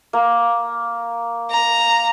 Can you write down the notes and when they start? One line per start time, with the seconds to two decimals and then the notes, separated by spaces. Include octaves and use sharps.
0.13 A#3
1.50 A#5